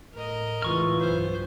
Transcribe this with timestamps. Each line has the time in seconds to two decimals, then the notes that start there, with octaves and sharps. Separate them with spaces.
0.14 A2 A#4 D#5
0.62 C#2 A2 C#3 E3 F4 C#6 F6
0.99 B1 G2 B3 C5